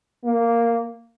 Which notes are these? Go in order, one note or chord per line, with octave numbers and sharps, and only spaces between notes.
A#3